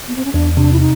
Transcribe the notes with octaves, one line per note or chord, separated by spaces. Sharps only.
B3
C4
C#4
E2 D4
C3 D4
E4
D#4